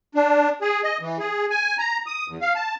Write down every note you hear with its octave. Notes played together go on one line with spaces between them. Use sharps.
D4
G#4
D#5
E3
G#4
G#5
A#5
D#6
E2
F5
A5